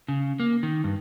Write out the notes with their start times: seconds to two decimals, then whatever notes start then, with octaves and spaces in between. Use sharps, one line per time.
0.08 C#3
0.40 A#3
0.63 D#3
0.84 G2